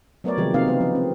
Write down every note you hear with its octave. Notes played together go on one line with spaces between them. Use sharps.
F#3 A3 B3 A#4 C#5 D5
C3 D#3 F3 F#3 G#3 G4
C3 A#3 C4 D#4 F5
C#3 B3 D#4
F3 B3
C4